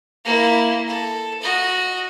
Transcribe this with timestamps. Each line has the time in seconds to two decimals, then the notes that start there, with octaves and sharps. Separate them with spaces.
0.25 A#3 E4
0.88 A4
1.42 F#4 D#5